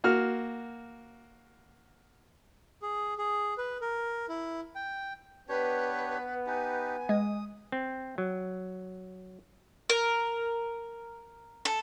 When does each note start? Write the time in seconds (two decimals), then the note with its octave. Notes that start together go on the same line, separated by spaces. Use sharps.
0.04 A#3 F#4 F6
2.82 G#4
3.18 G#4
3.58 B4
3.81 A#4
4.29 E4
4.75 G5
5.49 B3 D4 G4 B4 C#5
6.47 D#4 G4 B4 G#5
7.09 G#3 D#6
7.72 C4
8.18 F#3
9.90 A#4
11.65 A4